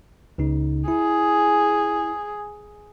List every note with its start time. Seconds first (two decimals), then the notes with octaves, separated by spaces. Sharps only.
0.38 C#2 C#3 D#4
0.88 E4 G#4